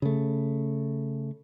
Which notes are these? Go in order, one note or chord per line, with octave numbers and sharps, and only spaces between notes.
C#3 A3